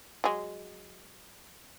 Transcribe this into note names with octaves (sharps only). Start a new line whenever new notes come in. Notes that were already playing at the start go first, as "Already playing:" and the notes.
F#3 G#3